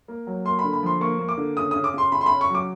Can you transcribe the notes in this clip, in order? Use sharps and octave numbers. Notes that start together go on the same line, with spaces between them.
A#3
F#3
A#3 C6
B5
D3
B5
F3 C6
A#3 C#6
A#3
D6
D3
C#3 D#6
C#3 D#6
D6
C#3 C6
C#3 B5
C6
B5
C#3
C#6
F#3 D6